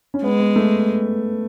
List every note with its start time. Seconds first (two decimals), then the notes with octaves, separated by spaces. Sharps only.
0.14 C#4
0.23 G#3 B3
0.40 B3
0.56 A3